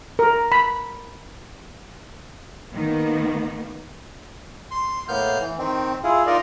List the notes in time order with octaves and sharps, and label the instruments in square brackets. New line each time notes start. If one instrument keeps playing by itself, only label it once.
[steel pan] A#4
B5
[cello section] D#3 A#3 B3
[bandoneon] C6
A2 A#3 B3 F6 G6
E3
D#3 C4
E4 F4 G#4
D#4 F4 A#4 D5 D#5